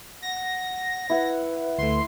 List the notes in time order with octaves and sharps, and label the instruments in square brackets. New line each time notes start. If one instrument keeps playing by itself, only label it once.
[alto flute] F#5 [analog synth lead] A#6
[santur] E4 E5 F#5 [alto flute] B4
[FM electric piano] D2 A3 [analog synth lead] C6